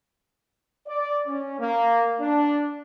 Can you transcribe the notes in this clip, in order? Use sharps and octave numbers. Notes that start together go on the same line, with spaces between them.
D5
C#4
A#3
D4